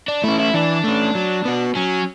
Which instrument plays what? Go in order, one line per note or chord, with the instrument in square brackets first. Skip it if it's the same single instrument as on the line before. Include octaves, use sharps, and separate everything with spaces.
[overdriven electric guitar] D4
[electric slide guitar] A3 C#4 [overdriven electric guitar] E4
[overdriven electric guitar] E4
[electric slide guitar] E3 [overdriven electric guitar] D4
[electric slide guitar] A3 C#4
F#3
B3 F#4
[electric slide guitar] F#3 [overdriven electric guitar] C#4